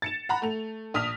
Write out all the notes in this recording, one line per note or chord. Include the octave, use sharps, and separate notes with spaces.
A6 C#7 E7
F#5 A#5 B5
A3 F7
A#1 D#6 F6 B6 F7